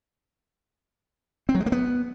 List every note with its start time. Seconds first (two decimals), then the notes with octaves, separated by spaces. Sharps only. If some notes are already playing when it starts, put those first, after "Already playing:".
1.49 C4
1.55 F#3
1.60 G#3
1.66 A#3
1.72 B3